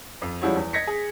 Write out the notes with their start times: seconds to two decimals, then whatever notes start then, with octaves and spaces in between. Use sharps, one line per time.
0.22 F2
0.42 F3 G3 G#3 E4 F#4 C#5
0.56 E2
0.73 D#5 G#6 A#6 B6 C#7
0.87 G#4